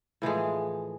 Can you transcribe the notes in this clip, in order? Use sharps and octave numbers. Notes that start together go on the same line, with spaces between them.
A2 E3 F3 G#3